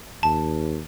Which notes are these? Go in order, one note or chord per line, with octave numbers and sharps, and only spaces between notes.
D#2 A5